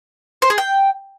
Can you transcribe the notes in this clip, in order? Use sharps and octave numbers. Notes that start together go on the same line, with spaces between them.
C5
G#4
G5